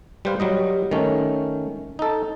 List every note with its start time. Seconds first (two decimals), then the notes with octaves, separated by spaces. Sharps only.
0.25 G3 B4 C5 F5
0.40 F#3 G3 D#5
0.91 D#3 A3 C#4
1.99 D#4 A4